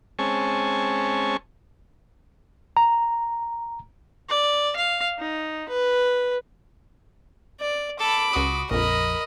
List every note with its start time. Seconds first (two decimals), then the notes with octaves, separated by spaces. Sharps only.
0.19 G#3 C4 C#4 G#5 A5 C#6
2.77 A#5
4.29 D5
4.76 F5
5.18 D#4
5.69 B4
7.60 D5
7.99 A4 B5 D6
8.33 C#2 F#4 D#6
8.71 A#1 F2 A#4 D#5 B5